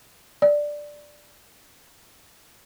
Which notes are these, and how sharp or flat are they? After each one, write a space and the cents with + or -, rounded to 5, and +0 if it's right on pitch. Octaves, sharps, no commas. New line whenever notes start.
D5 +5